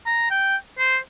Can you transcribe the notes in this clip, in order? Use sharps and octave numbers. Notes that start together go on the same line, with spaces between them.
A#5
G5
C5